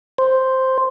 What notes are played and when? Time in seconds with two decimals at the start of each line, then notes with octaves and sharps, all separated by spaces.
0.18 C5